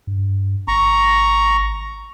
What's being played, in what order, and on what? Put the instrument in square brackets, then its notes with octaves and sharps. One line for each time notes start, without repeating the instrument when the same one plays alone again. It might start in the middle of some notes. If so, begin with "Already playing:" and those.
[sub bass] G2
[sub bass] G#1 [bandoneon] A#5 C#6